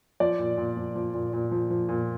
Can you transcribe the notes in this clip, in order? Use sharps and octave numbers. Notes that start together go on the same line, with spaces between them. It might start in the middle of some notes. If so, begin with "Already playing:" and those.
F3 D5
A#2
A#2
F3
F3
A#2
A#2
F3
F3
A#2